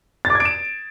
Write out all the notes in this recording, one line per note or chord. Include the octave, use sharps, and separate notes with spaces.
A6
D6
G#6
D7
E7